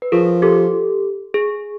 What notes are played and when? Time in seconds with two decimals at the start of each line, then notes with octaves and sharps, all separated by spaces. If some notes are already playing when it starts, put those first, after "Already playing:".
0.02 B4
0.12 F3 G#4 A#4
0.42 G4 A4
1.34 G#4